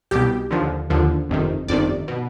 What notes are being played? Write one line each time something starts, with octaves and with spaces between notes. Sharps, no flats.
C2 B2 G4
D#2 D3 F3
D#2 D3 F3
G1 F2 C3 D#3
G1 F2 C3 D#3 D5
B2